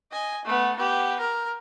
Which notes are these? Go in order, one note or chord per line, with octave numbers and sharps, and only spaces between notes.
D#5 G#5
A3 B3
B3 G4
A#4